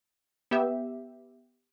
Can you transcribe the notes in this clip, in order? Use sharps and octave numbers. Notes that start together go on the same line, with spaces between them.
B3 G4 E5